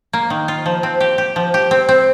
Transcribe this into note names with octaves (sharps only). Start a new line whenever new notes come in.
A#3
D#3
F4
F3
C4
G4
G4
F3
G4
C4
C4